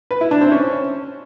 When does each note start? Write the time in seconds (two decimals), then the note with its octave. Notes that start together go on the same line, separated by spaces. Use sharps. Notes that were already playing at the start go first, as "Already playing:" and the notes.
0.11 B4
0.21 E4
0.31 D4
0.41 C4
0.52 C#4